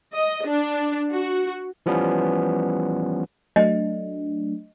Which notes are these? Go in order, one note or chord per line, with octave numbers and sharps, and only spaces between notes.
D#5
D4
F#4
E3 F3 G3 B3 C#4
F#3 A3 D4 D#5